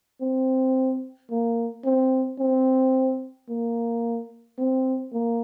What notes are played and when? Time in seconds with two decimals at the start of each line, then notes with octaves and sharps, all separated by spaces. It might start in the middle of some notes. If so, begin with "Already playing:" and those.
0.21 C4
1.30 A#3
1.84 C4
2.39 C4
3.49 A#3
4.58 C4
5.13 A#3